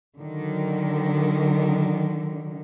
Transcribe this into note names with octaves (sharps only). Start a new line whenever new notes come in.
D3 D#3 F#3